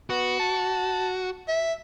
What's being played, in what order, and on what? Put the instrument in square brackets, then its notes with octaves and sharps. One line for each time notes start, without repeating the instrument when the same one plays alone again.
[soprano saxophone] B3 [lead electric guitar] F#4
[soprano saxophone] A5
E5